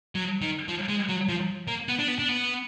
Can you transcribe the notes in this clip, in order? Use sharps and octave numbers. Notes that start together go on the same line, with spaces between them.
F#3
D#3
F3
G#3
F#3
F3
A#3
B3
D4
B3
D4
B3